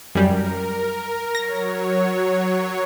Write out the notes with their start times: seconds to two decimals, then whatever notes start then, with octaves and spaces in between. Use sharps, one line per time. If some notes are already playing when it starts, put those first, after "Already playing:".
0.15 F#2 G3 A#4
1.35 F#3 C#5 A#6